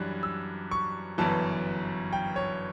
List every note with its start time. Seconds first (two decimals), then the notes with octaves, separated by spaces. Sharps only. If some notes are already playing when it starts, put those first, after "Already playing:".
Already playing: F#2 E3 G3 D4 F#6
0.23 E6
0.71 C#6
1.18 G1 F#2 E3 A5
2.13 G5
2.36 C#5